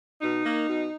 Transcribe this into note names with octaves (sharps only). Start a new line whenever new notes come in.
B2 D#4
A#3
B2